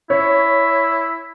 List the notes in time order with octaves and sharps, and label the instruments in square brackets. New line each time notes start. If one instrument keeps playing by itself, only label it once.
[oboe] E4 [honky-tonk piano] C#5